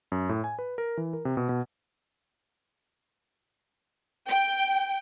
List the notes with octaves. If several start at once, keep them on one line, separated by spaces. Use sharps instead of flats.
F#2
A2
G#5
B4
A#4
E3
A#4
C3
B2
B2
G5